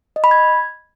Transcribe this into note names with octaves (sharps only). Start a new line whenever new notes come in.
D#5
B5
G#6